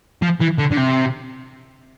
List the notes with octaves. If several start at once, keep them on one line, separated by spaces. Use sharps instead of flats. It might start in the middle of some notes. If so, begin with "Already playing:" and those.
F3
E3
D3
D3
C3